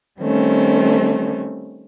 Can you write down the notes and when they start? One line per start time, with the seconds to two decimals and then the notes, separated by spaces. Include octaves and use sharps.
0.21 D#3 G3 A3 C4 C#4